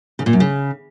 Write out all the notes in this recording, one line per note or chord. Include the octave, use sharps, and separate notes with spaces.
C#3
A#2
F#2
C#3